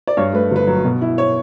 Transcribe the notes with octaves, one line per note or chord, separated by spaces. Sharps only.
D5
G2 C#5
A3 B4
G1 B4
F#3
B2
E4
C#5